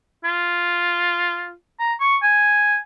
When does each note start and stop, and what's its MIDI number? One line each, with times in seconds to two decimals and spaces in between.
0.24 1.52 65
1.79 1.93 82
2.00 2.17 85
2.23 2.77 80